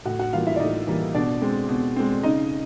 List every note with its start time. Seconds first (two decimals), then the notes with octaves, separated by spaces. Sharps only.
0.05 A2 F#4 F#5
0.19 F#4 F#5
0.33 E3 G3 A#3 F4 F5
0.46 E4 E5
0.56 D5
0.60 A2 D#4 D#5
0.87 E3 G3 A#3
1.15 B2 D4 D5
1.42 G#3 C4
1.69 B2
1.96 G#3 C4
2.23 C#3 D#4 D#5